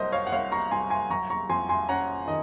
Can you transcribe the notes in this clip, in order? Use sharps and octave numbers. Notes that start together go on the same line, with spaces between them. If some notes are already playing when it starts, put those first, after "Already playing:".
Already playing: C2 F#3 A#4 C5 D#5
C#5 F5
F#5
C2 C#5 F5
A#5 C#6
C2 G#5 C6
G#5 C6
F#3 A#5 C#6
A#5 C#6
F2 G#5 C6
G#5 C6
C#4 F#5 A#5
D#3 D#5